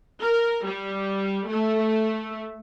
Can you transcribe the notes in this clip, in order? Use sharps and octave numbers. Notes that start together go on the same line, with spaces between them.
A#4
G3
A3